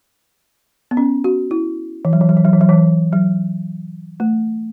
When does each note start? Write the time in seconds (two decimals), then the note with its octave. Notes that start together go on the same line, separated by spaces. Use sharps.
0.91 B3
0.97 C#4
1.24 F#4
1.51 E4
2.05 E3
2.13 F#3
2.21 E3
2.29 F#3
2.37 E3
2.45 F#3
2.53 E3
2.61 F#3
2.69 E3
3.13 F#3
4.20 A3